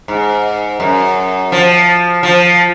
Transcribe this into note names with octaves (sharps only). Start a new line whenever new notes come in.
G#2
F#2
F3
F3